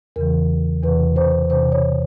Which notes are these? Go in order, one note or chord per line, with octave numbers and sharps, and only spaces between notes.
E2 C#3 E3 A#4
E2 C3 E3 B4
C5
E2 C3 E3 C5
C#5